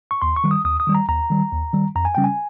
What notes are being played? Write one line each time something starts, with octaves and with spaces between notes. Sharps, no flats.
C#6
D#2 C6
C#6
D#3 G3
D#6
D#2 D#6
D#6
D#3 G3
A#5
D#2 A#5
D#3 G3
D#2
D#3 G3
F2 A#5
G#5
C#3 G3 C#4 G5
G#5